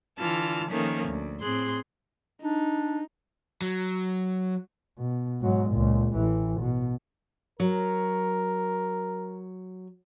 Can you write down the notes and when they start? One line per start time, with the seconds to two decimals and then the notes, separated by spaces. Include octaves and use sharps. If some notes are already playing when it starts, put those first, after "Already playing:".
0.18 D3 E3 F4 A5 F6
0.69 D#3 F3 A3 A#3 C#4
1.07 D2
1.40 A2 C4 G#4 C6 F#6
2.42 D4 D#4
3.62 F#3
4.98 B2
5.41 G#2 F#3
5.71 C#2 A#2
6.14 A1 E3
6.61 B2
7.60 F#3 A#4